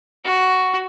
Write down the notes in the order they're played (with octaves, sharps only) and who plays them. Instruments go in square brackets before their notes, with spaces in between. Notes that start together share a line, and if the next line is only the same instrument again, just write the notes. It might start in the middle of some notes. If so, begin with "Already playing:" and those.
[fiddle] F#4